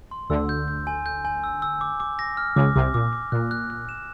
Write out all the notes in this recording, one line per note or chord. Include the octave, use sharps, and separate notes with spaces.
C6
D2 D3 E6
G6
G6
G#5
G6
G#5
E6
E6
D6
D6
A#6
F6
C#2 C#3 D6
C2 C3 D6
A#2 D6
D6
A#2 F#6
F#6
F#6
E7